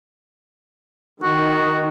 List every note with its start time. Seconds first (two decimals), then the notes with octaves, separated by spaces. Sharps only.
1.23 D#3 F#4